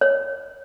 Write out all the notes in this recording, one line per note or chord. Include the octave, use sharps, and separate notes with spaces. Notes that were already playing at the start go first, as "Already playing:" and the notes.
C#5